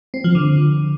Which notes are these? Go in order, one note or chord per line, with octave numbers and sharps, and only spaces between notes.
C4
F3
D3